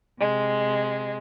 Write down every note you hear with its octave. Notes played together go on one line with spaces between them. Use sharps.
C3 G#3